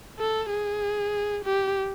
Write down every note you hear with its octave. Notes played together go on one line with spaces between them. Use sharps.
A4
G#4
G4